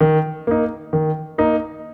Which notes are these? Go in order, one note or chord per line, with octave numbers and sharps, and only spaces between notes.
D#3
A#3 D#4
D#3
A#3 D#4